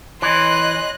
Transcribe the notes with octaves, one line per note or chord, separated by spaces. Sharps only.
E3 C#5 D#5 C6 F#6